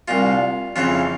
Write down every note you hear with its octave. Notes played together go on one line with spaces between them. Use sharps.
C2 A#2 F4
F2 C#3 E3 F4